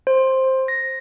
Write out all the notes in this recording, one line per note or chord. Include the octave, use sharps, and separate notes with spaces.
C5
A#6